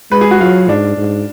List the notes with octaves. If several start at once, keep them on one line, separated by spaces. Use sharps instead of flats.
G#3 B4
G#4
F#4
F#3 F4
G#2 D4
G#2